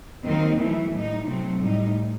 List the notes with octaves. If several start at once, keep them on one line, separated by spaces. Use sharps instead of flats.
D#2 D#3 F#3 C4 D#4
E3 A3 E4
A2 G3 D#4
C3 F#3 A3 C4
A2 G3 D#4